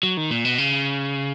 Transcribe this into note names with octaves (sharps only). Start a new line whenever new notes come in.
F#3
D#3
A#2
B2
C#3